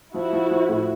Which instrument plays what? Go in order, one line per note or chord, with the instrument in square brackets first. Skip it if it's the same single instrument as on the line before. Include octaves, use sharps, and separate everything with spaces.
[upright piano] F3 [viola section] E4 F#4
[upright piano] F3
F3
A2